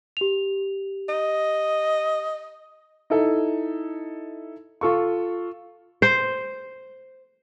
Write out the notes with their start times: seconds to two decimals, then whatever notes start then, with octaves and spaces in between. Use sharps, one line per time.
0.17 G4 F7
1.09 D#5
3.10 D#4 E4 A4
4.81 F4 A4 C#6
6.02 C5